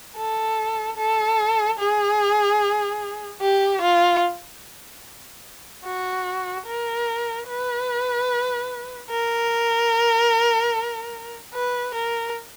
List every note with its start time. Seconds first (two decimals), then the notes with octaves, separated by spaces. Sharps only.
0.16 A4
0.97 A4
1.79 G#4
3.41 G4
3.81 F4
5.84 F#4
6.66 A#4
7.48 B4
9.10 A#4
11.54 B4
11.94 A#4